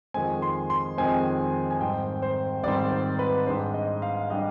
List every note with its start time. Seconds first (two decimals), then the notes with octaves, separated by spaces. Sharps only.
0.14 F2 D#3 G#3 C4 G#5
0.42 C6
0.70 C6
0.98 F2 D#3 G#3 C4 G#5
1.71 G#5
1.80 G#2 D#3 G3 C4 G5
2.22 C5
2.63 G#2 D#3 G3 C4 D5
2.92 C5
3.19 B4
3.47 G#2 G3 D4 C5
3.74 D#5
4.02 F5
4.30 G3 D4 D#5